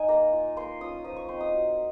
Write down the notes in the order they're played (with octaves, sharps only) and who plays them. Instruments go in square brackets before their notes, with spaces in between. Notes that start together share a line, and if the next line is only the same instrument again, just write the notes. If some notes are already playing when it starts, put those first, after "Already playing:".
Already playing: [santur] D#4 G#5
A#3 A#5
F4
A#3 C6
C#4 F4 D#6
F3 D#6
C#6
C4 D#4 C6
D#6
F#3